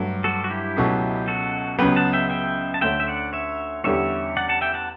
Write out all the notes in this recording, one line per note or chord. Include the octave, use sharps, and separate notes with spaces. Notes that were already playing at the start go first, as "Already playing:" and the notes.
Already playing: G2 F#3 A3
F#4 A4
F#4
E4 G4
C#2 B2 F#3 A3
F#4 A4
C#2 C#3 F#3 B3 G4 B4
F#5 A5
E5 G5
E5 G5
A5
D2 D3 A3 C#4 E5 G5
E5
D5 F#5
C#5 E5
E2 D3 G3 C#4 G4 C#5 E5
D5 F#5
F#5 A5
E5 G5
F#5 A5